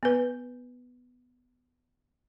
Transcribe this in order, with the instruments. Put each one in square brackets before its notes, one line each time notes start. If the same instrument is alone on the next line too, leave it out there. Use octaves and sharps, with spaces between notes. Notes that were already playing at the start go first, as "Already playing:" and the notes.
[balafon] B3 B4